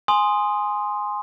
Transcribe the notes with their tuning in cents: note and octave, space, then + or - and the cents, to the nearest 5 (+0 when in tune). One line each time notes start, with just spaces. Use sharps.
G#5 +0 C6 +0 D#6 +0